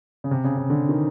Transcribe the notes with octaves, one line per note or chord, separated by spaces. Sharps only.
C#3
C3
C#3
C#3
D3
D#3